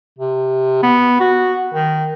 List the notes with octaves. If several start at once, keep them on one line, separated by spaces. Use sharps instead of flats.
C3
B3
F#4
D#3